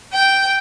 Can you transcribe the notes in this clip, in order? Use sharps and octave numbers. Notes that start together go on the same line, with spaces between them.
G5